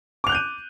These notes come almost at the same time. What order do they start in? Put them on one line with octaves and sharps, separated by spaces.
D6 F7 F#6 G6 D#7